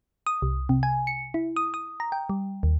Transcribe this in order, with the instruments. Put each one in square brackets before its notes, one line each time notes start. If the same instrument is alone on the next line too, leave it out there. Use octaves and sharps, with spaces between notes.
[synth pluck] D#6
C2
C3
G#5
C#7
E4
D#6
D#6
A#5
G5
G3
D#2